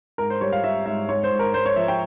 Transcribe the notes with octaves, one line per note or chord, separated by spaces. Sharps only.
G#2 A#4
C5
G3 C#5
F5
G3 E5
G#2 E5
G#2 C#5
C5
G#2
A#4
G#2 C5
C#5
F3 E5
G5